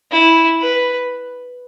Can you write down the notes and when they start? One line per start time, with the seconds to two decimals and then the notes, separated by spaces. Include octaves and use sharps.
0.12 E4
0.61 B4